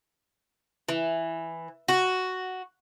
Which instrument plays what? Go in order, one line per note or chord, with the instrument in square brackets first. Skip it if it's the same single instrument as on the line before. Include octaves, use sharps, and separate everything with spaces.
[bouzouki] E3
F#4